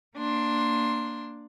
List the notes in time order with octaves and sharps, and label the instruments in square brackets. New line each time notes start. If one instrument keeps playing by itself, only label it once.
[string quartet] A#3 D4 C6